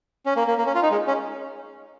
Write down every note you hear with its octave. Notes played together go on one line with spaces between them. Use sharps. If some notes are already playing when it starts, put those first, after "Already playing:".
C#4
A#3
A#3
A#3
C#4
F4
D#4
G#3
C#4